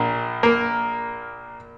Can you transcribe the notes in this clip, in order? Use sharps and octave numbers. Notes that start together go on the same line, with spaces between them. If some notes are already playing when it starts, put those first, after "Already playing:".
Already playing: A#1 A#2
A#3 A#4